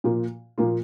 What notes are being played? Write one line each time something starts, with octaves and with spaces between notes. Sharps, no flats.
A#2 F3 A#3 F4
A#2 F3 A#3 F4